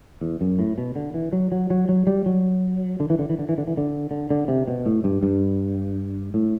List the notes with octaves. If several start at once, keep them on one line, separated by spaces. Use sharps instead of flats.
E2
F#2
A2
B2
D3
E3
F#3
F#3
F#3
F#3
G3
F#3
D3
E3
D3
E3
D3
E3
D3
E3
D3
D3
D3
C3
B2
A2
G2
G2
A2